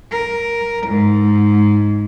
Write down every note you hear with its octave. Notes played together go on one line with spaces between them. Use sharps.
A#4
G#2